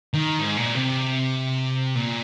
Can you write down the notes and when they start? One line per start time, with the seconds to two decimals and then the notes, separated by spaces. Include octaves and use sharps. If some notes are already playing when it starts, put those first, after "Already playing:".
0.14 D#3
0.39 G#2
0.57 A#2
0.75 C3
1.95 A#2